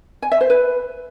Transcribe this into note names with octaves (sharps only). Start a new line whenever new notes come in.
G#5
E5
C5
B4